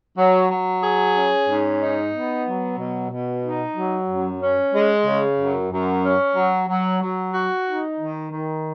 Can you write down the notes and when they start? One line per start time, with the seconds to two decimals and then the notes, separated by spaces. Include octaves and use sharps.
0.18 F#3
0.51 F#3
0.83 G#4
1.17 C#4
1.49 G#2
1.81 D#4
2.14 B3
2.46 F#3
2.79 B2
3.11 B2
3.44 D#4
3.76 F#3
4.08 F#2
4.41 C#4
4.73 G#3
5.06 C#3
5.39 F#2
5.71 F#2
6.05 C#4
6.36 F#3
6.69 F#3
7.02 F#3
7.34 F#4
7.66 D#4
7.99 D#3
8.31 D#3